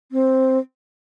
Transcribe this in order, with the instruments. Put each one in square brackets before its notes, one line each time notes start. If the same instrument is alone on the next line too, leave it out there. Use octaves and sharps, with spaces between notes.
[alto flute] C4